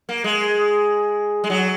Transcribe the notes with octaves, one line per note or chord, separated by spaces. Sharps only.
A#3
G#3
G#3
F#3